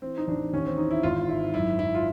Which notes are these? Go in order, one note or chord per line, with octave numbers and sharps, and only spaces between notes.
E3 C4
D#4
A1 D4
D#2 C#4
C4
E3 D#4
E4
G#1 F4
G#2 E4
F#2 E4
F#2 E4
F4